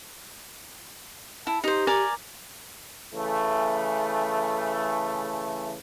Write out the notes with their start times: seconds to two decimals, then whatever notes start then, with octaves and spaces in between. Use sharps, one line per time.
1.47 E4 A5
1.64 D#4 G4 C5
1.87 A#4 D5 G#5
3.15 C#3 E3 A3